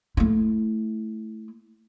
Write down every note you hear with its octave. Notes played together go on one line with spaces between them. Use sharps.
A3 E4